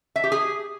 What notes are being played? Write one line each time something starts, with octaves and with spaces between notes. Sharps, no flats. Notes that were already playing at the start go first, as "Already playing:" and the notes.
E5
G4
G#4